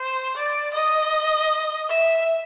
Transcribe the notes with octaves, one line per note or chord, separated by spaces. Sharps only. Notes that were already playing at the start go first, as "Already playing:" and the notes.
Already playing: C5
D5
D#5
E5